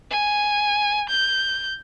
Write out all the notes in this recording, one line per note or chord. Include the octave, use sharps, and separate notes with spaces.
G#5
G6